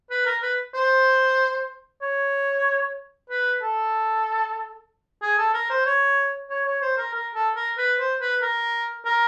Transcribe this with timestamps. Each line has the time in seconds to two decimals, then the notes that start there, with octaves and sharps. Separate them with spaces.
0.10 B4
0.26 A#4
0.42 B4
0.74 C5
2.02 C#5
3.30 B4
3.62 A4
5.22 G#4
5.38 A4
5.54 A#4
5.70 C5
5.86 C#5
6.50 C#5
6.66 C#5
6.82 C5
6.98 A#4
7.14 A#4
7.35 A4
7.56 A#4
7.78 B4
7.99 C5
8.21 B4
8.42 A#4
9.05 A#4